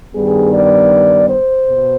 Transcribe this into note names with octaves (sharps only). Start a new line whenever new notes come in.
G2 D#3 G3 B3 G#4
D5
C5
B2